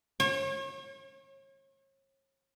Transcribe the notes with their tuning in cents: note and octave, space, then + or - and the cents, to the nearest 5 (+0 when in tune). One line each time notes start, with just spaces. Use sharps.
C#5 -35